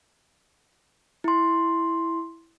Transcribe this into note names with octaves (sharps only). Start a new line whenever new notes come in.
E4 C6